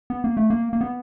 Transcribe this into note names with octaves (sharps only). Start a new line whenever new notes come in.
B3
A#3
A3
A#3
A#3
B3